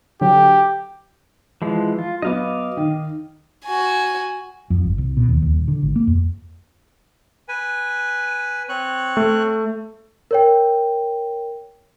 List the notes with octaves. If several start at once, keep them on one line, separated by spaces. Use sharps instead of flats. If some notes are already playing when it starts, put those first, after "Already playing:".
D3 F#3 G4 G5
E3 F3 G#3
F4
F#3 B3 D#5 F5 D6
D#3
F#4 G#5
F2
G1
C2
B2
D#2
D#2
D#1
D3
G#1
A#3
F2
B4 G#5
C4 C#5 F#6
A3
A#4 C#5 G5